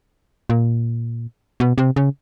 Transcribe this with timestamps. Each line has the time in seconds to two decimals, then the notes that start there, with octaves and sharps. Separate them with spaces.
0.50 A#2
1.60 B2
1.78 C3
1.96 C#3